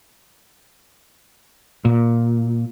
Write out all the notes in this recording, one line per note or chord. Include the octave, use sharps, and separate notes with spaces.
A#2